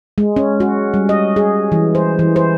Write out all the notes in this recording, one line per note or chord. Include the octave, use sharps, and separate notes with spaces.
G#3
C#4
F#4
G3
D#5
G#4
E3
C5
E3
C5